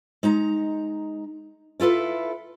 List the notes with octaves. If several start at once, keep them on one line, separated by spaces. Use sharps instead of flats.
G#3 D#4 A#5
E4 F4 A4 B4